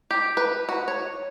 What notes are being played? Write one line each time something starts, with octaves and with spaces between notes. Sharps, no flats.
G4
B4
F#4
C#5